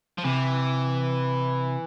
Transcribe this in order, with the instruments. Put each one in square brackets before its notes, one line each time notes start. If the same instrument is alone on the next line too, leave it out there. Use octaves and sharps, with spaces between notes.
[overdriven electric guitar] F3
[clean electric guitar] C3 [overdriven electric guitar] E3